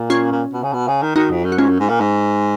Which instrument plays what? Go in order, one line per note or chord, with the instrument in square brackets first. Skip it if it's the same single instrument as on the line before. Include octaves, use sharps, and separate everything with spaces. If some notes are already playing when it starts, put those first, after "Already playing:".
Already playing: [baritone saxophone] A#2
[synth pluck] C#4 F4
[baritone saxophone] A#2
B2
C#3
B2
C#3
D#3
[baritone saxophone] D#3 [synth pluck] D#4 F#4
[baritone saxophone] F2
F#2
[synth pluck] F#4
[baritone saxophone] G#2 [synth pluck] C#4 F4
[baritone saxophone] F#2
G#2
A#2
G#2